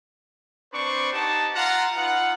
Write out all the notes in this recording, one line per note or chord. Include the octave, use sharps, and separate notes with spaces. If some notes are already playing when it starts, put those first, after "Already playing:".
C4 D4 B4 C5 D5 C#6
D#4 G4 F#5 A5
F4 F#5 A#5
D#4 F4 B4 F#5